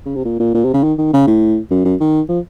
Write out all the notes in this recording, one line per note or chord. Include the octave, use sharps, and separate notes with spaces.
C#3
C3
A#2
A#2
A#2
C3
C#3
D#3
D#3
C#3
A2
F#2
F#2
D#3
F3